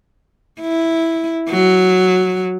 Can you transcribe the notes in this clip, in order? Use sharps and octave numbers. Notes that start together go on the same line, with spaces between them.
E4
F#3